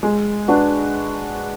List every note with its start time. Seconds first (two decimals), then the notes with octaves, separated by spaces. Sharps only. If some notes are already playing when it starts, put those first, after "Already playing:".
0.03 G#3
0.48 D4 F#4 B4